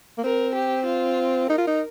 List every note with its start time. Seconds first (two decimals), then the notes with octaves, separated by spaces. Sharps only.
0.18 A#3
0.24 C4 A#4
0.55 G4
0.86 F4
1.50 D#4 A#4
1.58 F4
1.67 D#4